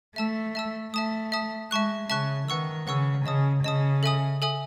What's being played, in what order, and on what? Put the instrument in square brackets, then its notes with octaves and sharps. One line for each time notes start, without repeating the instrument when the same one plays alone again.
[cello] A3 [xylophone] E5 A5 E6
[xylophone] E5 A5 E6
[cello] A3 [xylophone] E5 A5 D#6
[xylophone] E5 A5 D#6
[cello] G#3 [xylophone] E5 A5 C#6 F#6
[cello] C#3 [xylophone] E5 A5 C#6 F#6
[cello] D#3 [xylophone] B4 F#5 C#6 E6
[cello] C#3 [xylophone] B4 F#5 C#6 E6
[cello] C#3 [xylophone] D#5 A5 D#6
[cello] C#3 [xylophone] D#5 A5 D#6
[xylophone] A4 E5 G#5 D#6
A4 E5 G#5 D#6